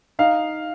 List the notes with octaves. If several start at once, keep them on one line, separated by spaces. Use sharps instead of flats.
D#4 F5